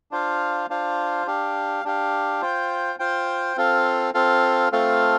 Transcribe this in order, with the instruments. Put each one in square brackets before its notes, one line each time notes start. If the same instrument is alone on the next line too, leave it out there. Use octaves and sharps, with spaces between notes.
[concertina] D4 F4 C5 F5
D4 F4 C5 F5
D4 G4 F5
D4 G4 F5
F4 C5 G5
F4 C5 G5
C4 F4 A4 F5
C4 F4 A4 F5
A3 C4 F4 A4 F5